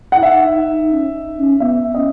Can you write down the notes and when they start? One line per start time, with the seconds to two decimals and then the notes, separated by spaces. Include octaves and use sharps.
0.12 E4 F#5
0.22 D#4 E5
0.56 D#4
0.91 C#4
1.14 D#4
1.38 C#4
1.60 B3 E5
1.95 C#4 D#5